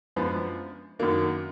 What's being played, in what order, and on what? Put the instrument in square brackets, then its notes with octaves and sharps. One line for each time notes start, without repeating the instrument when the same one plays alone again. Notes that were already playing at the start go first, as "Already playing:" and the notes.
[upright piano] F#2 F3 G#3 B3 D4
F#2 D#3 F#3 A#3 D4